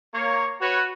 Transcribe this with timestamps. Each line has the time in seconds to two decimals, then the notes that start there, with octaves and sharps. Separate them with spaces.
0.13 A#3 C#5
0.61 F#4 B4 C#5